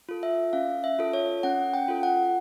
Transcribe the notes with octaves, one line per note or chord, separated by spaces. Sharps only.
F4 A4
E5
C#4 F5
E5
F4 A4
C#5
C#4 F#5
G5
F4 A4
F#5